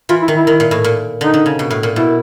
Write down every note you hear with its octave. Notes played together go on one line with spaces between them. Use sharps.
E3 F4
E4
D#3
E4
D#3
A#2
A2
A#2
D3 D#4
D3
C#3
B2
A2
A#2
B2 E4